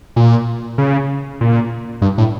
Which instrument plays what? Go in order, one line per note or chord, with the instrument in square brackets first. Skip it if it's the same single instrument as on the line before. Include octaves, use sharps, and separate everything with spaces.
[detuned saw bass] A#2
C#3
A#2
G2
A2